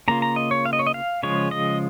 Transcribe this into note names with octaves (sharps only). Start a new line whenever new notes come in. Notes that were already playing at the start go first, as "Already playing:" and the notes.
C#3 A#3 F4 A#5
A#5
D#5
C#5
F5
D#5
C#5
D#5
F5
C#3 F3 G#3 F4 C#5
D#5